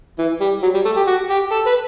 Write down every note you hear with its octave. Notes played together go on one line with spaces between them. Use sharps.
E3
G3
F#3
G3
A3
G4
F#4
G4
A4
B4